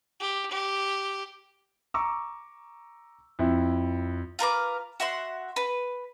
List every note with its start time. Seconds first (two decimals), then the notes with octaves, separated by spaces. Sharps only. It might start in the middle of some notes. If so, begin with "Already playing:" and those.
0.20 G4
0.51 G4
1.94 A#5 C#6 D6 E6
3.39 F2 E4
4.39 F4 A#4 B4 D6
5.00 F#4 E5 F#5 C6
5.56 B4